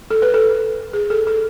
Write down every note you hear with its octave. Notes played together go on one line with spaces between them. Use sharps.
A4
B4
A4
G#4
A4
A4